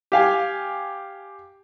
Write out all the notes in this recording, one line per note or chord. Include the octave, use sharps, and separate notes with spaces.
G4 F5 G#5